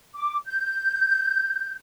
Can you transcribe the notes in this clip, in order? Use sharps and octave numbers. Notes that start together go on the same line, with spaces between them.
D6
G6